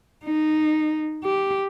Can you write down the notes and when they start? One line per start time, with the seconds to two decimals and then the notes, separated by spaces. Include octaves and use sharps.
0.24 D#4
1.24 G4